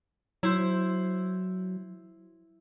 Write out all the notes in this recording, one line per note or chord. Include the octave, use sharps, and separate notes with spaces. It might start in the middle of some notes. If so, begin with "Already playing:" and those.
F#3 E4 C5